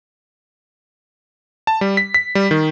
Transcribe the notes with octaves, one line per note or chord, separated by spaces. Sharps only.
A5
G3
B6
B6
G3
D#3